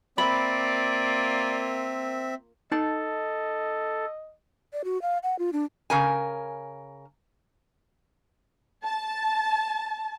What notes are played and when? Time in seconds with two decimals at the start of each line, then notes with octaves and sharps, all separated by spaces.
0.18 A#3 C4 F4 D5 E5 B5
2.72 D#4 A4 D#5 A5
4.73 D5
4.84 F#4
5.02 F5
5.23 F#5
5.39 F4
5.53 D4
5.90 C#3 A#4 G#5
8.83 A5